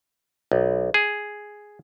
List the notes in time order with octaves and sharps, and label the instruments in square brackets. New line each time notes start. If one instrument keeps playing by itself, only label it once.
[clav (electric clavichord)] B1
G#4